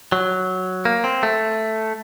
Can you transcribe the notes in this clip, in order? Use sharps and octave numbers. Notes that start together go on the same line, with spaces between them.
F#3
A#3
C4
A3